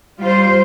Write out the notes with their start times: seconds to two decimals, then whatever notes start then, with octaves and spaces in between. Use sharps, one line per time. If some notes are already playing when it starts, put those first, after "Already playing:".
0.19 G3 F4 C5